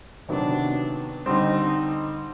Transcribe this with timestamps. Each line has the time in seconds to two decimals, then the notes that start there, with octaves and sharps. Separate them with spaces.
0.29 C3 D#3 F#3 B3 D4
1.26 D3 G3 C4 D#4